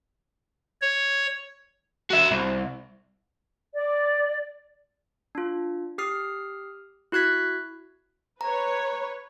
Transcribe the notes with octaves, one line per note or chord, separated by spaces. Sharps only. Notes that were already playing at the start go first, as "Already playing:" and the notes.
C#5
F#4 E5
C2
D5
D4 F4
G4 D#6 F6 C7
E4 F#4 F#6 G#6 B6
B4 C#5 A#5